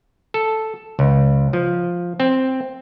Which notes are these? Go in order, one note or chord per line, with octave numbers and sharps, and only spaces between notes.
A4
C#2
F3
C4